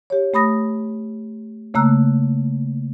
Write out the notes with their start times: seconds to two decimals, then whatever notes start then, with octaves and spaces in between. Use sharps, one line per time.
0.10 G4 C#5
0.34 A3 B5 D#6 A#6
1.74 C#3 A3 A#3 A#5 E6 F#6